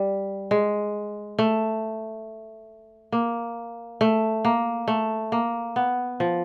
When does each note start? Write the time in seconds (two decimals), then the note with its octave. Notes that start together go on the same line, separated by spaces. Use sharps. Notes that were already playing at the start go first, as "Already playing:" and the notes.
Already playing: G3
0.51 G#3
1.38 A3
3.12 A#3
4.01 A3
4.45 A#3
4.88 A3
5.32 A#3
5.76 B3
6.20 F3